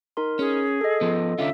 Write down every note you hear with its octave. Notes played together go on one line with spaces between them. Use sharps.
D#4 A#4 C6
C#4 G#4
A4 D#5
F3 B3
D3 C#4 F4 E5